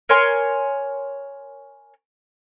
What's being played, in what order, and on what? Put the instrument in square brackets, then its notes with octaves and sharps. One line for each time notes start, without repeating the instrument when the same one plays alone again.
[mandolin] A#4 C#5 G#5 C6